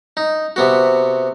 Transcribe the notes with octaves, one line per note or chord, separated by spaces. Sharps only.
D#4
C3 B3 F#4